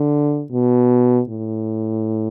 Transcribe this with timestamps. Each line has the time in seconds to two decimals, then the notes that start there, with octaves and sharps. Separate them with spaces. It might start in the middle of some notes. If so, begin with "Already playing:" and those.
Already playing: D3
0.52 B2
1.29 A2